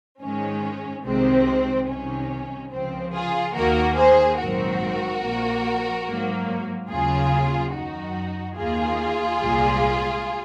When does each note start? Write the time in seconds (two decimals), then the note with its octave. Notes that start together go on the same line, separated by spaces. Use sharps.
0.20 G#2 D#3 G#3 C#4
1.04 C2 C3 D#3 G#3 C4
1.87 C2 C3 D#3 C#4
2.71 C#2 C#3 F3 C4
3.13 F4 G#4
3.55 D#2 D#3 A#3 F#4 A#4
3.97 G#4 C5
4.38 A#1 G#2 D#3 F#3 C4 F#4 A#4
5.22 A#1 A#2 F3 A#3
6.06 G#2 F#3 A#3
6.89 D#2 C#3 F#3 F4 G#4
7.72 F#2 D#3 F#3 D#4 F#4
8.56 D#2 D#3 A#3 F4 G#4
9.41 C2 A#2 G#3